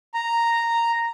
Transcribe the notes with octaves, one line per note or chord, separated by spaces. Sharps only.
A#5